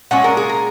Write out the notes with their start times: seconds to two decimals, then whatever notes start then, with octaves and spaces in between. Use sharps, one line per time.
0.11 A#2 G#3 C#4 F#5
0.24 A#4
0.37 G#4
0.50 A#4